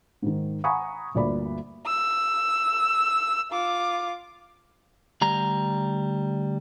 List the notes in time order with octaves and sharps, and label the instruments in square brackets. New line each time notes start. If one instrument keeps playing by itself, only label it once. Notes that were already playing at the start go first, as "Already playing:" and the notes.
[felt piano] G#2 D#3
F#5 G#5 A#5 B5 C#6 D#6
G1 D2 A#3 D5 B5
[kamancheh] E6
F4 D6
[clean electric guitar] D2 G3 A#5